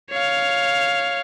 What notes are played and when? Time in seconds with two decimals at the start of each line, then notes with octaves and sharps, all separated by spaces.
0.12 C#5 F5